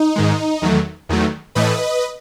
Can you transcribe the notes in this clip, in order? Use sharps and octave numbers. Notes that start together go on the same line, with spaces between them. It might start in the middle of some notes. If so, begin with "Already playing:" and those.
Already playing: D#4
G#2 D#3 G#3
E2 D#3 F#3 A3
E2 D#3 F#3 A3
A2 E3 A3 B4 D#5